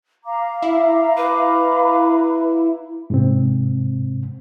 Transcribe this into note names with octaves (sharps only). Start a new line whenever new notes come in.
F5 A#5 D6
E4 E5
B4 B5
G#2 C3 C4